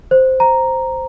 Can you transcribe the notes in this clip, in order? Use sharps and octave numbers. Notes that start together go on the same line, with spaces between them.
C5
A#5